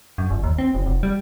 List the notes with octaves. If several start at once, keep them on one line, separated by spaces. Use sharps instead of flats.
F#2
G1
D#2
C4
F#1
F1
G3